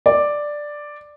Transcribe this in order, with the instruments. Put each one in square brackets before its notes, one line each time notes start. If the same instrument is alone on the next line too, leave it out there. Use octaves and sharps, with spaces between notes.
[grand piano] D5